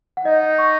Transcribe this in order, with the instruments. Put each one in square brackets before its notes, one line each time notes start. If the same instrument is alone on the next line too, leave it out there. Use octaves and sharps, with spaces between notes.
[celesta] F#5
[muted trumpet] D#4 [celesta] D#5
[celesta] C#6